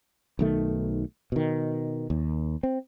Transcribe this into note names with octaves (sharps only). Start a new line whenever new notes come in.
B1 D#3 A3
B2 D#3
D#2
C4